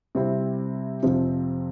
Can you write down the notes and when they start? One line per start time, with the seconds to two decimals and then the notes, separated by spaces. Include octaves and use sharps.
0.15 C3 G3 C4 E4
1.03 F2 C3 F3 C4